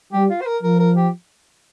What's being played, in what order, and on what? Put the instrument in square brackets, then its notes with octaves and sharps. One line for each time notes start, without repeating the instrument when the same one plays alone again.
[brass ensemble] G3 [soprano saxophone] G4
[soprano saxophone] F4
C5
A#4
[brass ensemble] F3 [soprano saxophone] A#4
[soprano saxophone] A#4
G4